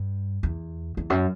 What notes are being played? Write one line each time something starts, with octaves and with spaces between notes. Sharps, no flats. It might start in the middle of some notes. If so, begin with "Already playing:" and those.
Already playing: G2
E2
E2
F#2